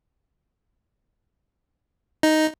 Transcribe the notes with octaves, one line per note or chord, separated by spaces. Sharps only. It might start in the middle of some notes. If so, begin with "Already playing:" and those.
D#4